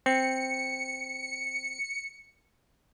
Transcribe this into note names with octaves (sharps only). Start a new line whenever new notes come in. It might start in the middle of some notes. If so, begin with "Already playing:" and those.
C4 C#7